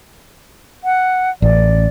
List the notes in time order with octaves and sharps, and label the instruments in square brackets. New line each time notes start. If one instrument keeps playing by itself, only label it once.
[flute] F#5
[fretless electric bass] A1 [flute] D5